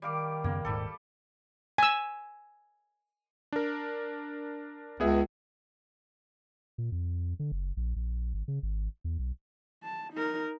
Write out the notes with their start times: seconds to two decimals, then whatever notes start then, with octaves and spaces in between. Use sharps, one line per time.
0.02 D#3 G3 F5 D6
0.44 F#2 C#3 A#3 B3
0.65 D#1 A1 G#2 G3 A4
1.78 G#5 E6
3.52 D4 A#4
5.00 C#2 B3 G#4 E5
6.78 A#2
6.92 F2
7.39 D3
7.52 F#1
7.77 A#1
7.96 A#1
8.34 G#1
8.48 C#3
8.63 G#1
9.04 E2
9.19 B1
9.83 A5
10.13 D#4 A#4